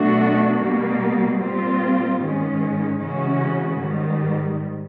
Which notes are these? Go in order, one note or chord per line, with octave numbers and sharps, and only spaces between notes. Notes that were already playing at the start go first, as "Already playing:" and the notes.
Already playing: B2 F#3 A3 D4 F#4
B2 G3 A#3
A#2 G3 C4 F4
G#2 D#3 G#3 C#4
C#3 E3 G#3 C#4 F#4
G#2 D#3 G3